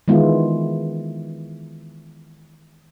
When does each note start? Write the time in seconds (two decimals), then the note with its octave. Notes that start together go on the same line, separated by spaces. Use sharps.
0.08 D#3 E3 G#3 B3 E4 F4